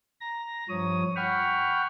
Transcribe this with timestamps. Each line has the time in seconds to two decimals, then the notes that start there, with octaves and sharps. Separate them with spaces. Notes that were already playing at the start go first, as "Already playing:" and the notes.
0.21 A#5 A#6
0.69 G2 F3 C#5 D#6
1.16 F#5 G5 B5 C#6 F6